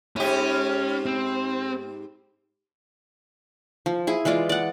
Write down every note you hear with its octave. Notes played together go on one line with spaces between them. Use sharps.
G#2 C#4 G4
C4
F3
E4 G#4
E3 G#3 F4 D5
D5 F#5